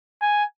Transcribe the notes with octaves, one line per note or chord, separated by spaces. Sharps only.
G#5